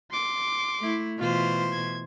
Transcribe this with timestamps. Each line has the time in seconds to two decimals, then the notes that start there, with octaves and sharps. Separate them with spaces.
0.11 C6 D6
0.80 A3 E4
1.18 B2 E3 F4 C5
1.72 G#6